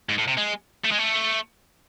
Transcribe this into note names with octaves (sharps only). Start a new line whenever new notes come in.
G#2
A2
C3
G#3
A3
G#3
A3